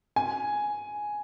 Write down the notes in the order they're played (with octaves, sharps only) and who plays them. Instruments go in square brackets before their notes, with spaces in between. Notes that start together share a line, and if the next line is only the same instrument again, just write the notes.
[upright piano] G#5